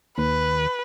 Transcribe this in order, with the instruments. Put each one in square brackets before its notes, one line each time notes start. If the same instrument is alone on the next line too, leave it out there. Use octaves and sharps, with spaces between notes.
[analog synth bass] D#2 [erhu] B4